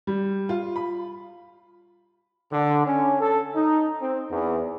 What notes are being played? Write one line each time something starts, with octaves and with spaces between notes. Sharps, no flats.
G3
F4
B5
D3
C#4
A4
D#4
C4
E2